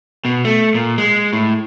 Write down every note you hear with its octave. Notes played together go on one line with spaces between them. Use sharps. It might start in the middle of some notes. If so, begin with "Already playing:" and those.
B2
A3
A#2
G#3
A2